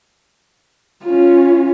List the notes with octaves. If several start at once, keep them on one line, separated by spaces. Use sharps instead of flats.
C#4 F4